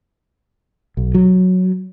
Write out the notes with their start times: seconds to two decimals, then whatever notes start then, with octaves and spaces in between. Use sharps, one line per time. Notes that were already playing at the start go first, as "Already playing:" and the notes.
0.97 B1
1.14 F#3